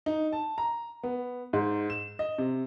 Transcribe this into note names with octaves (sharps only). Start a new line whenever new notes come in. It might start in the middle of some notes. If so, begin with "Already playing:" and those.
D#4
A5
A#5
B3
G#2
E7
D#5
C3